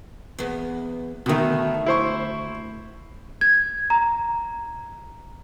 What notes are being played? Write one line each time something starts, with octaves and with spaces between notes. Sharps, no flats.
E2 B3
D2 B2 D#3 A3
E4 C5 C#6
G#6
A#5